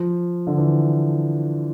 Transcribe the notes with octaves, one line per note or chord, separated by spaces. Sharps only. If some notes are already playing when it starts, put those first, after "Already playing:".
Already playing: F3
D3
E3